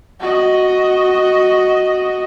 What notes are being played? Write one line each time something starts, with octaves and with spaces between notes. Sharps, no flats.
F#4 D#5